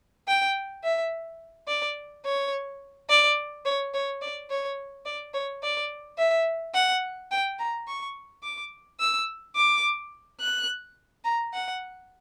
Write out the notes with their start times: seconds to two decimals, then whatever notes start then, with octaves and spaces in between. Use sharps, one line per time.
0.28 G5
0.84 E5
1.68 D5
2.25 C#5
3.10 D5
3.65 C#5
3.94 C#5
4.22 D5
4.50 C#5
5.05 D5
5.34 C#5
5.63 D5
6.18 E5
6.74 F#5
7.31 G5
7.59 A#5
7.88 C#6
8.43 D6
9.00 E6
9.56 D6
10.40 F#6
11.25 A#5
11.54 F#5